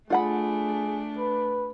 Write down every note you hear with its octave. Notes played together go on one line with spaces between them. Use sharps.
A3 D4 F4 G#4 F#5 B5
B4